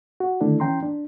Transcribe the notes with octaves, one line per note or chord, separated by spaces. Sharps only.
F#4
D3 D#3 A3 D4 E4
E3 C#4 G5 A#5 C6
D4